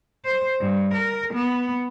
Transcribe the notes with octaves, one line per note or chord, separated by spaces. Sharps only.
C5
G2
A#4
B3